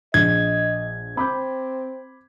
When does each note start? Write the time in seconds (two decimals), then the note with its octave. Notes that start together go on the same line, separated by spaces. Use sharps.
0.14 A#1 D#5 G#6
1.17 C4 B5 D6 G6